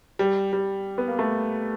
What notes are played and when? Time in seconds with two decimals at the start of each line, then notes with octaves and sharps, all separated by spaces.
0.19 G3
0.53 G3
0.98 B3
1.08 A#3
1.19 A3